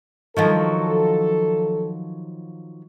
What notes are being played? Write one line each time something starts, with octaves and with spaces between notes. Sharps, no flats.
D#3 F3 F#3 A4